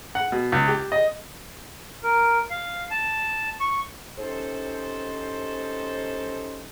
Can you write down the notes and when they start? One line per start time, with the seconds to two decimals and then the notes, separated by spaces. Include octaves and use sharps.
0.15 F#5
0.32 B2
0.52 C#2
0.68 G4
0.92 D#5
2.02 A#4
2.50 F5
2.91 A5
3.60 C#6
4.19 C#4 D#4 G4 A4 C5